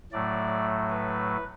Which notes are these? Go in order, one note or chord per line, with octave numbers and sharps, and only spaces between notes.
A2 F#3 A3 D5
B4